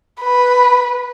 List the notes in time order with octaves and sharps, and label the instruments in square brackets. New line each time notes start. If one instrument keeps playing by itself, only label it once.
[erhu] B4